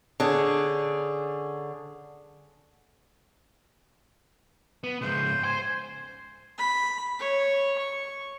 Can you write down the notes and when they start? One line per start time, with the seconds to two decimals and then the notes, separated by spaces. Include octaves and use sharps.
0.20 D3 C#4 G#4
4.84 B3
5.01 G#2 C#3 C5
5.44 C5 G#5 C6
6.58 B5
7.19 C#5
7.78 C#6